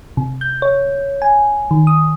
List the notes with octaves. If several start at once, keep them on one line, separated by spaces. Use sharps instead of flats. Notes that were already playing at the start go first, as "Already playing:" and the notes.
C3
G6
C#5
G#5
D#3
D#6